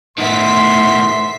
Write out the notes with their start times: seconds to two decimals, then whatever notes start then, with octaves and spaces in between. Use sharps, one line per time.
0.18 A2 D#3 B3 E5 C6 B6